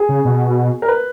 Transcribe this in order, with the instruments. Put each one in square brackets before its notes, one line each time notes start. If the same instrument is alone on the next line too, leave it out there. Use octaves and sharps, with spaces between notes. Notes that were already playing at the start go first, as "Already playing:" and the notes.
Already playing: [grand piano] G#4
[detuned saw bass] C#3
B2
[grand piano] A#4
B4